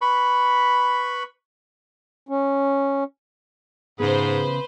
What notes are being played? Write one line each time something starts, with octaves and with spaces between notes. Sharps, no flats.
B4 B5 C#6
C#4
G#2 C#3 B3 G#4 B4 C5